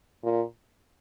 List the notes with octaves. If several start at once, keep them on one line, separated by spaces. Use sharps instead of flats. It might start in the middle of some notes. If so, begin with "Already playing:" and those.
A#2